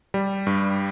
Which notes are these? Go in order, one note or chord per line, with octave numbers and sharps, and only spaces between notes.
G3
G2